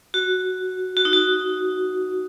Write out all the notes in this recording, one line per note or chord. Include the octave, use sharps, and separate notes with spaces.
F#4
F#4
D#4
F#4